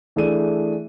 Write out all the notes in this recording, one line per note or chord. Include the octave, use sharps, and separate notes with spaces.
E3 A3 D4 G#4 D#7